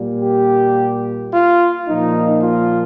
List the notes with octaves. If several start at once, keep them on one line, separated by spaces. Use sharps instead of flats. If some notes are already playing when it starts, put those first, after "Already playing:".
Already playing: A#2 G3 A#3
G4
F4
A#2 F3 A#3 D#4
F4